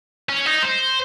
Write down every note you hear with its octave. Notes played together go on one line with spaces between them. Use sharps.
C#4
D#4
C5